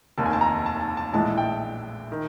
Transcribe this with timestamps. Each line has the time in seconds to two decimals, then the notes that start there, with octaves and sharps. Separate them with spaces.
0.18 F1 D#2 D#3 A5
0.26 G#5
0.33 A5
0.41 A#5
0.66 A5
0.81 A5
0.97 A5
1.13 A#1 A2 E3 G#3 A5
1.38 G5
2.12 D#3